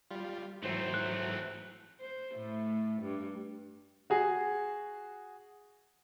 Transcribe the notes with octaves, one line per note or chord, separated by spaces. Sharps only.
G3 F4
G#2 E3 F#3 A3 C4 C5
F#6
C5
A2 A3
G2
F#4 G#4